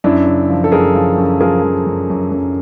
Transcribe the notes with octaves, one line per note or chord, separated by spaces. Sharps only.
F#2 D4 E4
C#3
F3
A4
F#2 G#4 A#4
F3
F#2
F3 G#4 A#4
F3
F#2
F#2
F#2